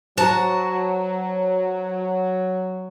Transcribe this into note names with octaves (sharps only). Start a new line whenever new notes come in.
F#3 F#4 C5 A5 A#5